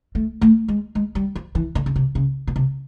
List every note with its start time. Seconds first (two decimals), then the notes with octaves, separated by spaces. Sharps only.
0.15 A3
0.41 A3
0.68 G#3
0.95 G#3
1.15 G3
1.35 F3
1.55 E3
1.75 D3
1.86 C#3
1.96 C3
2.15 C#3
2.47 B2
2.56 C3